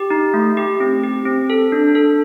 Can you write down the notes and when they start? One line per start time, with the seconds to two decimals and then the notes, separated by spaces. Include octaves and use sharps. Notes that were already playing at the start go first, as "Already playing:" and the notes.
Already playing: G4
0.10 D#4
0.34 A3
0.57 G4
0.80 C4
1.04 G4
1.26 C4
1.50 A4
1.72 D4
1.95 A4